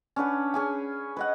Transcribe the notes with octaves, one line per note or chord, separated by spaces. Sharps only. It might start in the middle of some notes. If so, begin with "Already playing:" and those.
C#4 D4 B4 F#5
C#4 G#4 G#5
B4 D#5 F#5